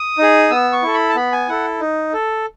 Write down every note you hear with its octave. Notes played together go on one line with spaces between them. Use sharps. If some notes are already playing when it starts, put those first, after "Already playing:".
Already playing: D#6
D#4 G#4
B3 E6
C#6
E4 A4
B5
A5
B3 B5
G#5
E4 A4 F#5
D#4
A4